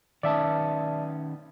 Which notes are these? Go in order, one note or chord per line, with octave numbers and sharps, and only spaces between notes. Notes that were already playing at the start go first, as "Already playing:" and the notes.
D#3 B3 C#4 D5 E5 A5